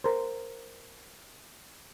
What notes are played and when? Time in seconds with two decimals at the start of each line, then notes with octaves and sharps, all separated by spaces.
0.04 A#4 C5